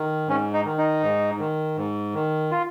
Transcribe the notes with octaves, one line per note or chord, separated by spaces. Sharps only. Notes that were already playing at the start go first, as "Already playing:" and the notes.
Already playing: D#3
G#2 C#4
D#4
D#3
D#4
G#2
D#3
G#2
D#3
F4